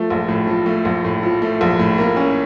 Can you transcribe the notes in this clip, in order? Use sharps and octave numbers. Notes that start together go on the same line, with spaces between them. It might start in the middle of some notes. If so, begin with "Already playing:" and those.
Already playing: F3 A3
A#1
A2
F3
A3
A#1
A2
F3
A3
A#1
A2
A#3
C#4